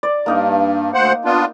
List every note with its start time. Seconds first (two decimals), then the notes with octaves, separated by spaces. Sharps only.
0.03 D5
0.26 G2 A#3 D#4 A#4
0.94 D2 C5 F#5
1.25 B3 D4 F4